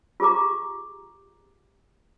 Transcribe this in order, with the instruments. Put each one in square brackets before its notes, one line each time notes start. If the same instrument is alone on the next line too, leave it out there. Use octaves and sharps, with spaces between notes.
[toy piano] F4 G4 G#4 A#5 D6